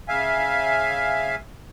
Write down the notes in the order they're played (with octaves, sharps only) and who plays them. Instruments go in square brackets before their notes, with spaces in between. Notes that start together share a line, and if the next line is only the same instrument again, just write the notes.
[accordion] C#3 E5 F5 G#5